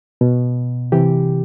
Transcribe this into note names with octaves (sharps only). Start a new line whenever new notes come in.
B2
C3 E3 G4